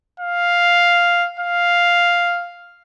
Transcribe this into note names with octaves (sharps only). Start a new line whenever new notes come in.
F5
F5